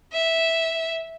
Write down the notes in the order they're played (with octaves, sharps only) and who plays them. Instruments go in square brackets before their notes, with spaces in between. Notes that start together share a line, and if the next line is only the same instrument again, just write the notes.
[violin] E5